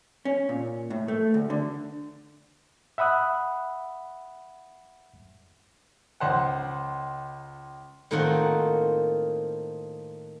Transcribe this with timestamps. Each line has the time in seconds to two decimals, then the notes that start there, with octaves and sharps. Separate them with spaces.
0.25 C#4
0.49 A#2
0.90 A2
1.08 A3
1.34 D2
1.50 D3
2.98 E5 F#5 B5 D#6 F#6
6.20 C#2 C5 F#5
8.11 A2 D#3 A#3 C4 F4 F#5